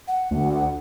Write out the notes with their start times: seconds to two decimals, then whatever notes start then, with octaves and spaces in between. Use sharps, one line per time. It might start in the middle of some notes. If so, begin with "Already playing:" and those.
0.08 F#5
0.31 D2